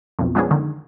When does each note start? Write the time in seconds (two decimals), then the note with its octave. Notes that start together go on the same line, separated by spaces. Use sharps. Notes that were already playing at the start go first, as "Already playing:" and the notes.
0.19 B1 F2
0.35 F3 G#3 B3 C#4 D4 G#4
0.51 D3 D#3